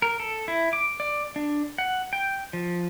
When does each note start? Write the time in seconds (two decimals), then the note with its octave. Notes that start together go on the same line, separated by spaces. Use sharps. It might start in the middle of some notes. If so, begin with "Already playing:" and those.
0.02 A#4
0.20 A4
0.48 E4
0.73 D6
1.00 D5
1.36 D4
1.78 F#5
2.13 G5
2.53 F3